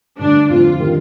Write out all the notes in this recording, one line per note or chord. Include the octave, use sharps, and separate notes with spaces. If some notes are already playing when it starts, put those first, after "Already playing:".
G2 D3 A3 D4
F2 D3 A3 C4 F4
D#3 G3 D4 G4 A#4